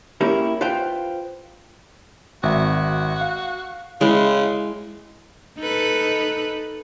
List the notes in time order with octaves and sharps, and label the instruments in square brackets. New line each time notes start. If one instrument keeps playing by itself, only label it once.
[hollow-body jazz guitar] A#3 C#4 E4 G4 A#4
F4 B4 C5 F5 G5
[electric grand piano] G#1 E5 [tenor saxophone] F#4
[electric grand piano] F5
[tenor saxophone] C#3 [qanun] G#3 E4
[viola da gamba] D#4 A4 B4